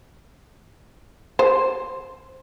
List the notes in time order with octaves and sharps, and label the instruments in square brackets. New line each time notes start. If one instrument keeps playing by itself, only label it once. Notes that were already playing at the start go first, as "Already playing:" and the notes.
[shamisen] C5